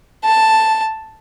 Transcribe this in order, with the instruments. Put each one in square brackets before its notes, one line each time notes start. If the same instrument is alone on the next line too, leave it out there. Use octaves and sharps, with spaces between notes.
[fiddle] A5